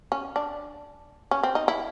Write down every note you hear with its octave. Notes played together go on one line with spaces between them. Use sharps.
C#4
D4
C#4
C4
D#4
E4